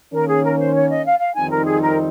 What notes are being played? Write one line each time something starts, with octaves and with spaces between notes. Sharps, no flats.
D#3 A#3 C#4 A#4
G#4
A#4
C5
C#5
D#5
F5
F5
F2 D#3 G3 C4 D#4 G#5
A#4
G#4
A#4